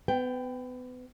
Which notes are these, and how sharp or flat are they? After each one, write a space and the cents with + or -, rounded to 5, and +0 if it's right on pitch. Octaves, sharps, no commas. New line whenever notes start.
B3 +30 G5 +0